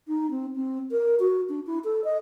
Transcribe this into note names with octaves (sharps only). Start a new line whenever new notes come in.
D#4
C4
C4
A#4
F#4
D4
E4
A4
D#5